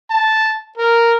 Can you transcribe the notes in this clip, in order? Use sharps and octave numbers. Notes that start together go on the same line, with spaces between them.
A5
A#4